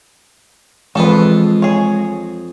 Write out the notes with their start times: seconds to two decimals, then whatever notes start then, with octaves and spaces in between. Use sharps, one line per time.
0.95 F2 E3 G#3 F4 A4 B4
1.62 G#4 C#5